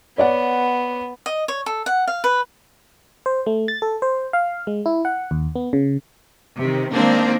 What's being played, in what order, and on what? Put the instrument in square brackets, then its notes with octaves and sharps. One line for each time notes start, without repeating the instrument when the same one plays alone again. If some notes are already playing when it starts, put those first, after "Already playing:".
[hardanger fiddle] B3 [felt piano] C#5 D5 F#5
[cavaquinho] D#5
C#5
A4
F#5
F5
B4
[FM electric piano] C5
A3
A6
A4
C5
F5
G#3
E4
F#5
D#2
B3
C#3
[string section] C3 D#3
D#3 G#3 A#3 C4 D4